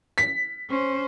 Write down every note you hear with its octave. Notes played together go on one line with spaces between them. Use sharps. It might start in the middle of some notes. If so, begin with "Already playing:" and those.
B6
C#4 C5